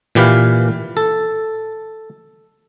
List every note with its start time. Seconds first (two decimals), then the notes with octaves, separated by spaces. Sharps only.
0.15 A#2 E3 G4 B4 F5
0.97 A4